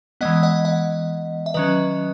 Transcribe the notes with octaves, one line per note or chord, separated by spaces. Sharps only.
E3 G#3 B3 D#5 F#5
D#5 F#5
D#5 F#5
E5
D#3 F#3 C#4 B4 D#5